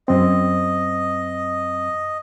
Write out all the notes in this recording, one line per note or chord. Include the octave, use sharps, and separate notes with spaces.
F#2 C4 D#5